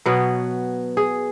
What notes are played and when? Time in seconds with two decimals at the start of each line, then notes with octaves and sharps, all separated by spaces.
0.06 B2 F#3 B3
0.97 G#4